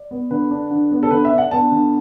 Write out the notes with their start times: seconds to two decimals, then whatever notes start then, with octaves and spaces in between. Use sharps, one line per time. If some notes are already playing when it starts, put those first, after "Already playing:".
Already playing: D5
0.11 B3
0.31 D3 B4
0.51 D4
0.71 D3
0.91 B3
1.03 A4
1.11 D3 B4
1.25 E5
1.31 D4
1.38 F#5
1.51 B3 A5
1.72 D3